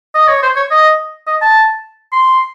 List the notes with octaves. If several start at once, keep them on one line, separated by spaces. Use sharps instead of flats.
D#5
C#5
C5
C#5
D#5
D#5
A5
C6